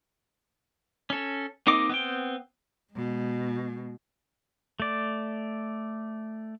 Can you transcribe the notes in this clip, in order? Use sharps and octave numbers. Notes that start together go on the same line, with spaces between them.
C#4 A4
A#3 C4 D#4 D#5 D6
B3 C4 G5
B2 G#3
A3 D5